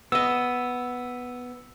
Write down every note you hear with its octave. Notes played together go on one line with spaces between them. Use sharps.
B3 D#5 E6